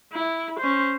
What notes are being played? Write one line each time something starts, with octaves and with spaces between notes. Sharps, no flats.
E4
C#4 C5